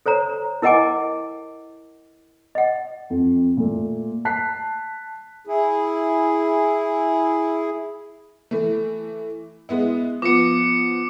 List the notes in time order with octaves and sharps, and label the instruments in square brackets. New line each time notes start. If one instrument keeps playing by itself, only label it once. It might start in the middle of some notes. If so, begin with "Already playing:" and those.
[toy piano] A4 C5 C#5 A#5
E4 A#4 D#5 F#5 G#5 D6
D#5 F#5
[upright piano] F2
A#2 A3
A5 F#6 B6 C7
[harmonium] E4 G#4
[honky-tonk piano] E3 A3
G#3 B3 E4
[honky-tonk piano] F3 B3 [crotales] D6 C#7